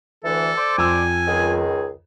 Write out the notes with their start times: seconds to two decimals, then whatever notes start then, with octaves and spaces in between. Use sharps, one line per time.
0.24 D2 E3 A4
0.57 C5 D5 D6
0.78 F2 G#5 E6
1.27 C#2 D#3 G#4